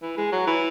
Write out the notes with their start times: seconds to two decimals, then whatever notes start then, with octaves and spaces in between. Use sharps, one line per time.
0.02 E3
0.17 G#3
0.32 F#3
0.47 E3